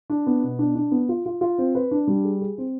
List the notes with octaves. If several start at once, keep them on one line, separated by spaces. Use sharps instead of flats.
D4
B3
B2
D4
D4
B3
F4
F4
F4
C4
B4
D4
G3
G#4
G#4
C4